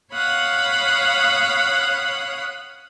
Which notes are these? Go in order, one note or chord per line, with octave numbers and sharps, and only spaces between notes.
C#5 F5 F#5 B5 D#6